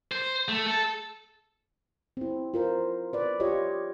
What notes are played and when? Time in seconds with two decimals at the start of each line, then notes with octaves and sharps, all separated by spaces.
0.12 C5
0.48 A3
0.66 A4
2.17 C4 E4
2.54 F4 A#4 C5
3.13 B4 D5
3.40 F4 G4 C#5 D#5